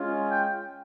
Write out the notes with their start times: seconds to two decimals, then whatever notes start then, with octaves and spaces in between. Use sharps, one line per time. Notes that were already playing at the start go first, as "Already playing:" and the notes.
Already playing: G#3 C#4 F4
0.30 G5